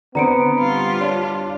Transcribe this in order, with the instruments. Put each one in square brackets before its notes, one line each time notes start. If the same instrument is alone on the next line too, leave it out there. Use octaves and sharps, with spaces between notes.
[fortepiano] D3 C4 [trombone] B3 [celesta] A#5 C#7 D7
[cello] G3 F4
[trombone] D4 [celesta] C#5